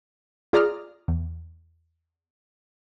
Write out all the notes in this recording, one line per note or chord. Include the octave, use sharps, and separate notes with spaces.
F4 G#4 D5 A#5 D#6 F6
E2